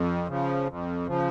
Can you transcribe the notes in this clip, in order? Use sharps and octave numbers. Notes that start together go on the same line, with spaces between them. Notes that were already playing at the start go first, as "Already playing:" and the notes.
Already playing: F2
C#3 F3
F2
C#3 F3